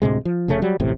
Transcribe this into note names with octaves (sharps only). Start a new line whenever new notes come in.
D2 A2 C3 G#3
F3
F1 C#3 A3 C#4
F#3 G3
E1 A1 A2 C3